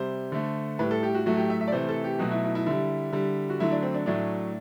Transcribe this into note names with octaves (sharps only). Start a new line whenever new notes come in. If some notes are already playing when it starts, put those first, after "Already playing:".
Already playing: C3 G3 C5
D3 A3
A2 G3 B4
A4
G4
F#4
A2 F#3 A3 F#4
G4
E5
E5
D5
C3 E3 A3 C5
A4
G4
B2 F#3 A3 F#4
E4
E4
E4
D3 G3 E4
D3 G3
F#4
D3 F#3 A3 E4
D4
C4
D4
A2 F#3 A3 D4